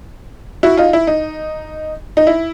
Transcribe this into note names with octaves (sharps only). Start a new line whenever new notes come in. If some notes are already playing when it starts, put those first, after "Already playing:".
E4 F#4
D#4 F4
E4
D#4
D#4
E4